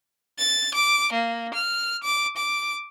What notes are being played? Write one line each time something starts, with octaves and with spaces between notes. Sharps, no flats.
A6
D6
A#3
F6
D6
D6